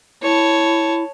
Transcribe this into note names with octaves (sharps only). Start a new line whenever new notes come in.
E4 C#5 A5